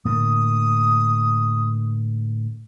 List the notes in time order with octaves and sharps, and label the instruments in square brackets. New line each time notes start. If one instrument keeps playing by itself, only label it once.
[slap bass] A2 D3 A#3 [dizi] D#6